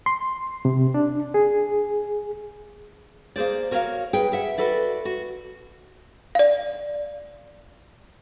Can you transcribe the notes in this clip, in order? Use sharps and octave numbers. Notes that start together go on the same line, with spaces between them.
C6
C3
D4
G#4
A#3 G#4 C5 D5
F#4 A#4 C#5 D#5 F5
G#4 B4 G5
G#4 E5 F#5
F#4 A4 B4 D5
F#4
D5 F5